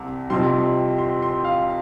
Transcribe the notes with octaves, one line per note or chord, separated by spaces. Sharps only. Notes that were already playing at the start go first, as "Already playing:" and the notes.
Already playing: C2 C3
F2 C3 G3 C6
C6
C6
F5